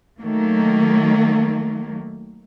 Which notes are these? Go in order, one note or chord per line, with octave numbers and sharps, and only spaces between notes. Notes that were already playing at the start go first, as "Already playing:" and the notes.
D#3 F#3 A3 A#3